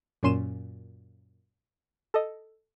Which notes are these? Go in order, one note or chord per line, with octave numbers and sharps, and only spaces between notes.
F#2 A#2 C#4 C6 D#7 E7
A4 D#5